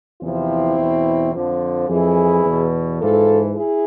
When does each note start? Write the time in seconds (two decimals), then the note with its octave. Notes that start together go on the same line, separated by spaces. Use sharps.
0.22 E2 C3 F3 C4 E4
0.78 E2 B2
1.34 F2 D3 F3
1.89 F2 E3 E4 G#4
2.45 E2 B2
3.01 G#2 E3 F4 A4
3.56 E4 G#4